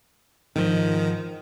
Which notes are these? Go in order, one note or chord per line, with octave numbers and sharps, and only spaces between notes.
G#2 D#3 F3